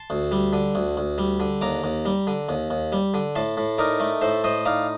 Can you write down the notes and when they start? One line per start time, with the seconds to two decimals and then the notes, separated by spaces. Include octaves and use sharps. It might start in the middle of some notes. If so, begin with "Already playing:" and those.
Already playing: A5 C6
0.10 D2
0.32 G3
0.53 D3
0.75 D2
0.97 D2
1.18 G3
1.40 D3
1.61 D#2 A#5 D6
1.84 D#2
2.05 G3
2.27 D3
2.49 D#2
2.70 D#2
2.92 G3
3.14 D3
3.35 A2 A5 C6
3.57 A2
3.78 D#4 A#4 D5
4.00 A3
4.22 A2 A4 C5
4.44 A2 C5 D#5
4.66 D#4 D5 F5